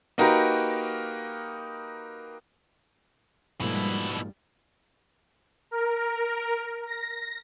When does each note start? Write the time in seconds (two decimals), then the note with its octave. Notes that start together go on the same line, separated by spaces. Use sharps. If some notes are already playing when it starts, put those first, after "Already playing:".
0.18 A#3 D#4 F#4 G4 A#4 B4
3.61 G#2 B2 F3 G3 A#3 E4
5.71 A#4
6.86 A#6